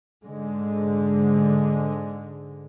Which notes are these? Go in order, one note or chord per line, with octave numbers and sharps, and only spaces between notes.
G#2 D3 G#3